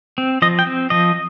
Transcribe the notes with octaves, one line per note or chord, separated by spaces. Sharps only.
C4
F3 D#5
G5
C4
F3 D#5